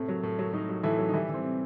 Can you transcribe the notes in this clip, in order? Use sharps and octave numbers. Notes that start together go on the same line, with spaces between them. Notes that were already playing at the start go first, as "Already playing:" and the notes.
Already playing: A2 C3 C4
F#3
A2
F#3
A2 D#4
F#3
A2 E3 E4
F#3
D#4
E3 G3 E4
E3 C4
C3